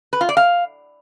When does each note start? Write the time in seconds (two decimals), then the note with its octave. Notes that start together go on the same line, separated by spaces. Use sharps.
0.13 B4
0.21 F4
0.29 D5
0.37 F5